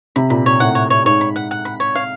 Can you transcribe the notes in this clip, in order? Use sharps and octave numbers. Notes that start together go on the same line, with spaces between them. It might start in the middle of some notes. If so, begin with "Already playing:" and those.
C3 B5
A#2 B5
A#2 C#5
A2 F#5
C#5
C#5
G#2 C#5
B5
F#5
F#5
B5
C#5
F5